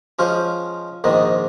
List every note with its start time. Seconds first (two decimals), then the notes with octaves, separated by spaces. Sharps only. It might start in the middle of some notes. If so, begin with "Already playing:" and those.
0.19 F3 G#3 C#4 F4 C5
1.04 A#1 G#2 D#3 G#3 D#4